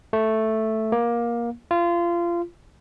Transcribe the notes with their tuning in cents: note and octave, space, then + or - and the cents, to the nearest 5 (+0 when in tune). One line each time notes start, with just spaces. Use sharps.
A3 +0
A#3 +20
F4 -25